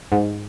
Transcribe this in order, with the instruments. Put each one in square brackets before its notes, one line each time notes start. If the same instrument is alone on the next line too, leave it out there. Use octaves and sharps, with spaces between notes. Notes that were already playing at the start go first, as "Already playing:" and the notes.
[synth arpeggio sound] G#2